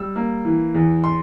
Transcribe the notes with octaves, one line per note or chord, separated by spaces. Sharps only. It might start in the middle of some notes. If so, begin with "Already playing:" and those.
Already playing: G3 E6
A#3
E3
E2
C6